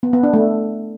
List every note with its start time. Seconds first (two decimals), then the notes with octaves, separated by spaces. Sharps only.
0.03 B3
0.13 B3
0.23 D4
0.34 A3